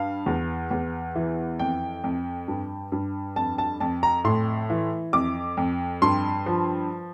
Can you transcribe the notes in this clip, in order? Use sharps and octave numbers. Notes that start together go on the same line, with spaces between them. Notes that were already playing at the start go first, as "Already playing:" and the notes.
Already playing: G2 F5
E2
E2
E3
F2 G5
F2
G2
G2
F2 A5
A5
F2 A5
A#5
A2 C6
E3
F2 D6
F2
G2 C6
F3